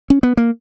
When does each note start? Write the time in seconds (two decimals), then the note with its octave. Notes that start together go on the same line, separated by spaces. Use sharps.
0.10 C#4
0.23 B3
0.37 A#3